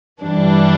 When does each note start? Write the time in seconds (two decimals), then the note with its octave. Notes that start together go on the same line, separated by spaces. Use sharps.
0.21 G2 E3 G3 D4